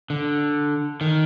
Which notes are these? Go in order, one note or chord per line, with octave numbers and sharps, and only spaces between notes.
D3
D#3